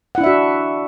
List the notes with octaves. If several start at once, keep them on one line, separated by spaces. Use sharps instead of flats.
D4 E4 F#4 E5 F#5